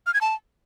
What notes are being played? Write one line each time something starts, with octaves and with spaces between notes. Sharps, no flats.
F6
G#6
A5